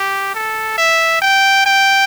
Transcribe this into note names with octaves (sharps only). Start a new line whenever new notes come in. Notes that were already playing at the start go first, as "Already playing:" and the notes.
Already playing: G4
A4
E5
G5
G5